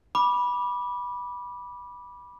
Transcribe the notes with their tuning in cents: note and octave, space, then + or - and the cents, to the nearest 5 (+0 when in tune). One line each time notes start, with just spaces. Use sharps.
B5 -15 D6 +0